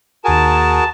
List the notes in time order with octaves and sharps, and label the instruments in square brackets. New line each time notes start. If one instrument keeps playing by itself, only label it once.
[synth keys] D#2 G#5 [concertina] F#4 G#4 A#4 [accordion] A5